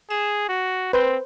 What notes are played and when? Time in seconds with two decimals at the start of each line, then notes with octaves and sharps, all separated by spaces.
0.10 G#4 E7
0.49 F#4
0.93 C4 B4 C5 G6